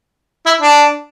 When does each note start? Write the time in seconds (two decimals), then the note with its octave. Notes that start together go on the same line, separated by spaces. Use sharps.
0.46 E4
0.61 D4